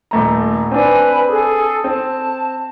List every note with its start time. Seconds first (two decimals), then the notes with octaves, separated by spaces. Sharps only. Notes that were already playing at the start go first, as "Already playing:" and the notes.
0.11 D#1 A3 A#5
0.71 C4 D4 B4 G#5
1.29 G#4 A4
1.84 C4 A5